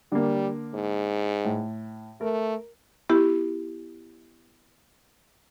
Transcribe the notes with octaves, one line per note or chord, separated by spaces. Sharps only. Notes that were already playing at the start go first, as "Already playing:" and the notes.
D3 G3 A#3
G#2
A2
A3 A#4
B3 E4 G4